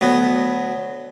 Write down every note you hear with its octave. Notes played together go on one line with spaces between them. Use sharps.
D2 F#3 B3